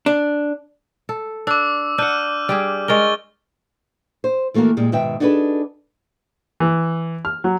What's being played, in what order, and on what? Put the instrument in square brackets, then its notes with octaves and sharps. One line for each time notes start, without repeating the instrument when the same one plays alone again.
[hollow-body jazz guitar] D4
[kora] A4
[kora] D4 [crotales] D6 E6
[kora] D4 F#5 [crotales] F6 G6 D#7
[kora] G3 G4 G#4
[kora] G#3 A#4 [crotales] C#6 A6 G7
[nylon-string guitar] C5
E3 A3 A#3 F#4 A#4
A#2 G3 G#3
G#2 B2 D#3 B4 E5 G5
D4 D#4 F#4 G#4 A4 B4
[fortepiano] E3
F6
F#3